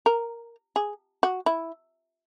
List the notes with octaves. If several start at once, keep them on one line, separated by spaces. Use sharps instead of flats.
A#4
G#4
F#4
E4